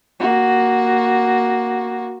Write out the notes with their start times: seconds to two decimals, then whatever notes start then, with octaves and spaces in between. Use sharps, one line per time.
0.20 A#3 F#4